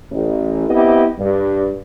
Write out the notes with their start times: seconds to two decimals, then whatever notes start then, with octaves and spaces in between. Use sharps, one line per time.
0.11 A1
0.68 B3 C4 E4 G4 D#5
1.18 G2